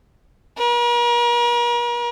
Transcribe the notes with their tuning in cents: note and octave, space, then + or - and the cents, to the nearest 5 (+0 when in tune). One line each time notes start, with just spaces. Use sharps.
A#4 +45